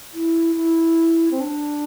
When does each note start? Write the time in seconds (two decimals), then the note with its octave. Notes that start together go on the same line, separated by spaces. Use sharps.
0.14 E4
0.56 E4
1.31 C4
1.41 D4